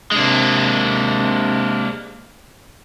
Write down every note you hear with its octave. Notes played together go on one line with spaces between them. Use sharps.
C3 G#3 A#3 D4